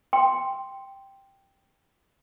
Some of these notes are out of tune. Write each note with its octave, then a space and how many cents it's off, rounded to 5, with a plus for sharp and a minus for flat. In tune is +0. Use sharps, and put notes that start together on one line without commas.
G5 +0 C6 +0